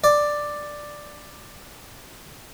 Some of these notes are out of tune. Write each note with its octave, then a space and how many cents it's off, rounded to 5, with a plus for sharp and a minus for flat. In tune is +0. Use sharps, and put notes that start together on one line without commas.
D5 +5